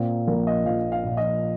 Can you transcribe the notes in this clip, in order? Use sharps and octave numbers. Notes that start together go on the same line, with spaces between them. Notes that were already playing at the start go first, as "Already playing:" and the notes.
Already playing: A#2 C4
A#1 A#4
D#5
F3 F5
F5
A#2
D#5